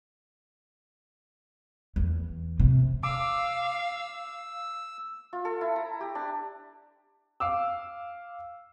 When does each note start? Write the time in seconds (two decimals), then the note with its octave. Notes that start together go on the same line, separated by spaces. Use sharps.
1.96 E2
2.60 C3
3.03 F5 D6 E6
5.33 F4
5.45 A4
5.61 E4
5.76 A#5
6.01 G4
6.15 D4
7.40 F5 D6 E6